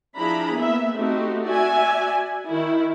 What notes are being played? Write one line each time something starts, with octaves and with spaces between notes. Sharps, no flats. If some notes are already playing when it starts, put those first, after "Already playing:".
F3 D4 E4 G#4 A#5 B5
A#3 B3 E5
A3 C4 D#4 F#4 G4
F#4 D5 E5 G#5
D#3 E4